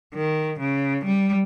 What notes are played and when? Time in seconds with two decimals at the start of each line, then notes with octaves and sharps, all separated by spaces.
0.14 D#3
0.60 C#3
1.05 G3